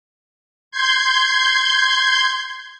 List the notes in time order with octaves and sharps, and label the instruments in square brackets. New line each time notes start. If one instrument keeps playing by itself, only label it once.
[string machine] C6 G6 G#6